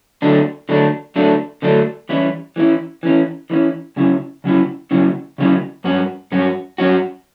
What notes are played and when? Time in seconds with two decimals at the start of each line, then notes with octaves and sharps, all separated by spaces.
0.22 D3 F#3 A3 D4
0.69 D3 F#3 A3 D4
1.16 D3 F#3 A3 D4
1.62 D3 F#3 A3 D4
2.09 E3 G3 C#4 E4
2.56 E3 G3 C#4 E4
3.03 E3 G3 C#4 E4
3.50 E3 G3 C#4 E4
3.96 C#3 F#3 C#4 E4
4.44 C#3 F#3 C#4 E4
4.91 C#3 F#3 C#4 E4
5.38 C#3 F#3 C#4 E4
5.84 G2 F#3 C#4 F#4
6.32 G2 F#3 C#4 F#4
6.78 G2 F#3 C#4 F#4